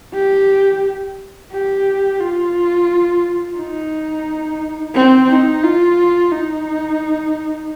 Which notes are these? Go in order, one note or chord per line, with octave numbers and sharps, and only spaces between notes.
G4
G4
F4
D#4
C4
D#4
F4
D#4